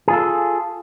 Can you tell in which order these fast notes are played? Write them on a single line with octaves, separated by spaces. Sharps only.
G#4 F4 A4